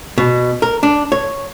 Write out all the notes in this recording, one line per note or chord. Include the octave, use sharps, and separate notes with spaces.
B2
A#4
D4
C#5